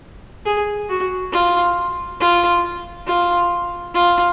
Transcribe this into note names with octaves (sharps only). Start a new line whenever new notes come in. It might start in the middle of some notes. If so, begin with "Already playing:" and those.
G#4
F#4
F4
F4
F4
F4